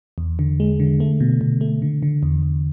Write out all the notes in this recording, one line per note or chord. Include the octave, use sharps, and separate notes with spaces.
E2
D3
G#3
D3
A3
B2
B2
A3
D3
D3
E2
E2